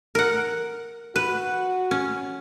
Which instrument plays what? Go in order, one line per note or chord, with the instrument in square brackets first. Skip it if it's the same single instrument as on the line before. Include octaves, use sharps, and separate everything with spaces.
[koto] A#4 F#5
[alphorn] F#4 [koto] B4
[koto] C#4